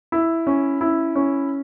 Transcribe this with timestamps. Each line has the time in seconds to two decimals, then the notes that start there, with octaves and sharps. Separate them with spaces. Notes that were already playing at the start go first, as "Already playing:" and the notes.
0.12 E4
0.47 C#4
0.81 E4
1.15 C#4